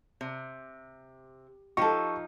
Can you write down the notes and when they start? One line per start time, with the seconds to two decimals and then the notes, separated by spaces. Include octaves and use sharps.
0.21 C3
1.77 F3 D#4 G4 A4 C#6